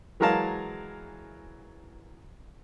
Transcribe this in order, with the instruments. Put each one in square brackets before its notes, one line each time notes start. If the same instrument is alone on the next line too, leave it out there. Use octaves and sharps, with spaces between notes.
[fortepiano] E3 F#3 G#3 A#4 F5 A5